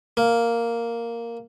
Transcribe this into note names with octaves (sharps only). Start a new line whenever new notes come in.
A#3